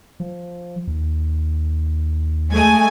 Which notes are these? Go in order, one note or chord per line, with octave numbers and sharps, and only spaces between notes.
F3
D#2
G#3 A3 G#5